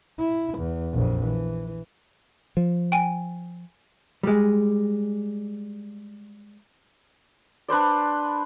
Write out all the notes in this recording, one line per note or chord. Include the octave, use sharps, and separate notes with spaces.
E4
E2
A#1 F2
E3
F3
G5 G#5
G3 G#3
D4 B4 C5 D5